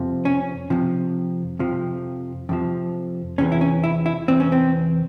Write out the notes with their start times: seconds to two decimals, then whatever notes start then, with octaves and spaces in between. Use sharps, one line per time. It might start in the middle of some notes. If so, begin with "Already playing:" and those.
Already playing: F2 C3 F3
0.25 C#4
0.70 F2 C3 F3
1.59 F2 C3 F3
2.49 F2 C3 F3
3.38 E2 C3 E3 C#4
3.52 E4
3.61 C#4
3.84 E4
4.06 E4
4.28 E2 C3 E3 C4
4.40 C#4
4.52 C4